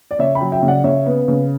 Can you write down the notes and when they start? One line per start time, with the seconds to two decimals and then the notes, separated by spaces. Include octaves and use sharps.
0.11 D5
0.19 C#3 C#5 E5
0.35 G5 B5
0.41 F#3
0.52 E5 G5
0.62 C#3
0.68 D5 F#5
0.84 C#3 C#5 E5
1.06 B3
1.28 C#3